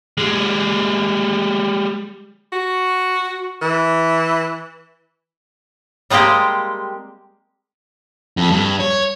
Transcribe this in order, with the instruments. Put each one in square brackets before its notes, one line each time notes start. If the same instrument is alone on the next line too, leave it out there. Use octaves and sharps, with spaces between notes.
[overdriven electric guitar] G3 G#3
[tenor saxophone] F#4
E3
[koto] G3 G#3 A#3 C4 G4
[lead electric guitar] F2
G2
C#5